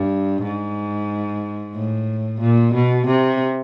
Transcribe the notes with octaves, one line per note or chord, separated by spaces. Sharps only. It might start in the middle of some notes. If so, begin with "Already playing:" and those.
Already playing: G2
G#2
A2
A#2
B2
C3